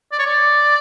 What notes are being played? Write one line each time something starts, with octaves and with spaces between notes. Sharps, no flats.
D5
C#5
D5